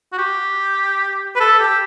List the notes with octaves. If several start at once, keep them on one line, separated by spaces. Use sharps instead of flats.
F#4
G4
B4
A4
G4